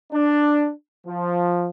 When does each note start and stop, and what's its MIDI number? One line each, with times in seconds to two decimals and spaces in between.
0.12 0.69 62
1.05 1.69 53